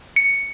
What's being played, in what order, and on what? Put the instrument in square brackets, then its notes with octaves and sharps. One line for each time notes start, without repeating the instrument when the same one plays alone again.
[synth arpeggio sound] C#7